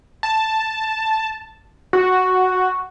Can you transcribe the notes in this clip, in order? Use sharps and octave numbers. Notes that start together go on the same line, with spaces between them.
A5
F#4